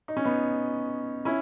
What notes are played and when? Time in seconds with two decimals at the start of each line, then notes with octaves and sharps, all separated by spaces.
0.08 D#4
0.17 C#4
0.24 B3 D#4
1.25 C#4 E4